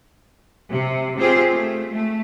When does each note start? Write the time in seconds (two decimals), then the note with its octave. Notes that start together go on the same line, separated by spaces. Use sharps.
0.71 C3
1.18 C4 F4 G4 G#4 C5
1.52 A3
1.92 A3